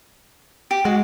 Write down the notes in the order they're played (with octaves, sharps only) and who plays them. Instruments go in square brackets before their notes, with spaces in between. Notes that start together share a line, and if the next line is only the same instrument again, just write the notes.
[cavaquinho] G4
[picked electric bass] G#3 [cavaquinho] F#4